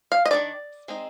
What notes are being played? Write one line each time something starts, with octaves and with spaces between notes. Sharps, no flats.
F5
D#5
D#3 A#3 D4 D5
G#3 C4 D#4